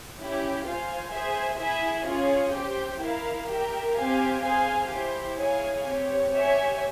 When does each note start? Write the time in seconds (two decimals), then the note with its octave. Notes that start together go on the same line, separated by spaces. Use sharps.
0.19 C#4 E4 G4
0.65 F4 C5 F5 G#5
1.12 G#4 C5 E5 G#5
1.59 E4 G#4 E5 G#5
2.07 C#4 F4 G#4 C#5
2.54 G4 C5 G5
3.01 E4 A#4 F5
3.49 G4 A#4 E5 G5
3.97 C4 G4 C5 F5 G#5
4.43 G#4 C5 F5 G#5
4.91 E4 G4 C5
5.38 E4 G#4 C#5 F5 G#5
5.86 C4 G4 C#5
6.33 G4 C#5 E5 G#5